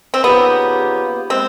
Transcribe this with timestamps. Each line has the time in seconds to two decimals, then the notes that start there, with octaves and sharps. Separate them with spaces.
0.14 C4
0.24 C#3 F3 A#3 B3 D#4 G4
1.30 G#3 B3 C4